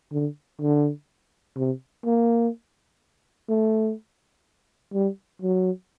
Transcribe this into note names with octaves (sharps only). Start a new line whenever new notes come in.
D3
D3
C3
A#3
A3
G3
F#3